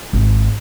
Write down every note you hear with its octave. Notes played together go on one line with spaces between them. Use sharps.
G#1